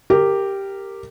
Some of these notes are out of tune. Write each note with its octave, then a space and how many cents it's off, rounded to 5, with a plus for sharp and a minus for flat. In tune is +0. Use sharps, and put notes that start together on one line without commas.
G4 +0 A#4 -15